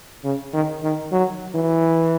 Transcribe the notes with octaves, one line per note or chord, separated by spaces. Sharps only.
C#3
D#3
D#3
F#3
E3